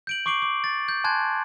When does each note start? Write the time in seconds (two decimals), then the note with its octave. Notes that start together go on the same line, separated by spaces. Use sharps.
0.07 G6 D7 F#7
0.26 C#6 D6 C7 D7 F#7
0.42 D6
0.64 A6
0.89 G6
1.04 G#5 A5 C6 F#6 G#6